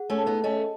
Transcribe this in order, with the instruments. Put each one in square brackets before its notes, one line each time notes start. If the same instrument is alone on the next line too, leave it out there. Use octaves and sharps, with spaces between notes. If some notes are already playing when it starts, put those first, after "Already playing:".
Already playing: [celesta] G#4 F#5
[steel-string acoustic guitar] A3 C#4
[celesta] A5
[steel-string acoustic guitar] B3 D#4
[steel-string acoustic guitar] A3 C#4 [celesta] D#5